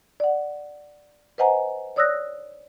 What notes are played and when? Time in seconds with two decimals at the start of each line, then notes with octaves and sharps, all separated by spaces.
0.20 D5 F#5
1.38 B4 C5 D#5 F#5 G#5 A#5
1.96 C#5 D5 D#6 E6 F#6 A#6